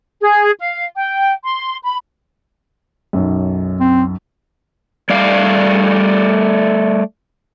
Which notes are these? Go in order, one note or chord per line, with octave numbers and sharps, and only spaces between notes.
G#4
F5
G5
C6
B5
B1 F#2
C4
G3 A3 D5 F5